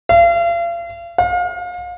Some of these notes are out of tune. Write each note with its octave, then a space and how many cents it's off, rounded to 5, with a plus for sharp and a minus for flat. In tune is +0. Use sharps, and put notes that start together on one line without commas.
F5 -40
F5 +35